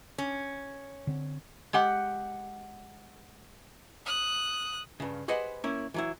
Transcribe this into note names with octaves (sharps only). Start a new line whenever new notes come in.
C#4
D3 C4
G#3 G4 F#5
D#6 F#6
G2 C#3
G4 G#4 B4 C5 D#5 F#5
A#3 C#4 E4
E3 F#3 E4